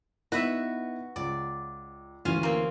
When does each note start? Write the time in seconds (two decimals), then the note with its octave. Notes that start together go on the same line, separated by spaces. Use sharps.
0.32 B3 D#4 E4 F#4 B4 E5
1.16 C#2 D5
2.25 D2 E3 C#4 F4 G#5
2.43 A#3 C4